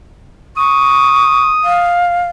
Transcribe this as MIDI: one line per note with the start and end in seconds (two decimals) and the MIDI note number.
0.57 1.49 85
0.57 1.99 87
1.64 2.27 77